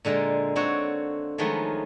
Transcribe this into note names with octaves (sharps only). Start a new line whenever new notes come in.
A#2 D3 G#3 A#3
D3 C4 F#4 C#5
D#3 F3 F#3 G#3 A3 B3